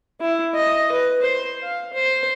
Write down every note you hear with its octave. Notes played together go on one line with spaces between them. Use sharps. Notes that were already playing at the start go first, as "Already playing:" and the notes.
E4
D#5
B4
C5
F5
C5